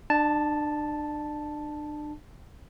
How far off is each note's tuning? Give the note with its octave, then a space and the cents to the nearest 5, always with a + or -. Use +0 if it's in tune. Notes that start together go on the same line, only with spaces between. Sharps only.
D4 +35 A5 +0